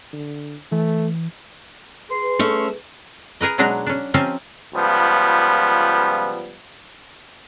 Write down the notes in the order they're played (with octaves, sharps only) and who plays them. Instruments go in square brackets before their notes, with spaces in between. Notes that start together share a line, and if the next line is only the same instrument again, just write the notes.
[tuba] D3
[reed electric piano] E3 [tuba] A3
[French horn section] G#4 B4 [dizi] C6
[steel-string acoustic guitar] A3 C#4 E5
[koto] G#4 A#4 B4 D#5
B2 F#3 G#3 D4 D#4 A#5
C#4 D4
F3 C4 C#4 D#4 G4 G#5
[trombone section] C#2 F3 G3 B3